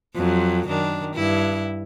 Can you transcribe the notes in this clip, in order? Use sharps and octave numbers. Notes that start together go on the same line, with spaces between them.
F2 F#3
F#2 D#3 D4
G2 E4